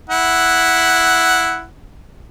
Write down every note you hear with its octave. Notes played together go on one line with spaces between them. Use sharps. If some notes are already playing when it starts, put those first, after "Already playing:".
E4 F#5